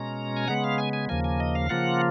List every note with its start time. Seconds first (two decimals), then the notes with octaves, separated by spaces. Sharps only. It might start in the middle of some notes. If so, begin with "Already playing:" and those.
Already playing: B2 G#3 C#4 A#5
0.37 G#5
0.48 C#3 G#3 B3 F#5
0.64 F5
0.78 G#5
0.93 G#5
1.09 D#2 C#3 F3 A#3 G#5
1.24 G#5
1.40 D#5
1.55 F5
1.69 C#3 F3 A#3 F4 F#5